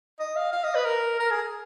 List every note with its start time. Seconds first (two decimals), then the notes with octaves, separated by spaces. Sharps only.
0.19 D#5
0.36 F5
0.53 F5
0.64 D#5
0.75 B4
0.85 A#4
1.20 A#4
1.31 G#4